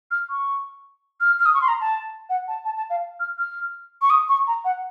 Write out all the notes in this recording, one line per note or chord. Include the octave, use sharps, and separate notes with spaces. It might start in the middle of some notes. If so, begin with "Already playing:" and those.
F6
C#6
F6
F6
D#6
C#6
C6
A#5
A5
F#5
A5
A5
A5
F5
F6
F6
C#6
D#6
C#6
A#5
F#5